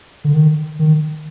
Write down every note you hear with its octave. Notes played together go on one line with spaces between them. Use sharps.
D3
D#3
D#3